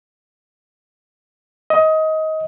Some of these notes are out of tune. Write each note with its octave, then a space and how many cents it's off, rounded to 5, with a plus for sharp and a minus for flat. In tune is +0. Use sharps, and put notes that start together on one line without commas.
D#5 +20